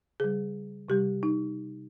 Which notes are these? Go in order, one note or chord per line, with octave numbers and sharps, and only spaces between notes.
C#3 G3 G#4
C3 G3 G4
D#4